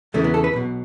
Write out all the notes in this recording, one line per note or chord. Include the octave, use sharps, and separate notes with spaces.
E2 C#3 E3 A3
B3
A4
B4
B1 B2